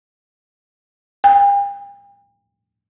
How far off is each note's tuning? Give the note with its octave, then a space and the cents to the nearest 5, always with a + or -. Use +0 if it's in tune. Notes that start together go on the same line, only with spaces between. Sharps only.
G5 +40